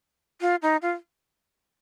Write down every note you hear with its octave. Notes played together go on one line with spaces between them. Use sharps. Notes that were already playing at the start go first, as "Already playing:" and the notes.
F4
D#4
F4